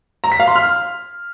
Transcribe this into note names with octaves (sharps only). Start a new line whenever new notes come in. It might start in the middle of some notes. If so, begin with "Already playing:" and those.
A#5
B6
F5
C6
F6